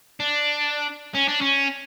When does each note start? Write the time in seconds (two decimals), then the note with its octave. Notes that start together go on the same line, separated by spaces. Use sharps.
0.20 D4
1.14 C#4
1.28 D4
1.41 C#4